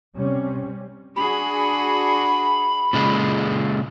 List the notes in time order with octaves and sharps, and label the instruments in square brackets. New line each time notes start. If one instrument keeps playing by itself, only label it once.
[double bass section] C3 G3 C4 C#4
[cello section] D4 F#4 G#4 [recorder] B5
[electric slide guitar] A#2 C#3 G#3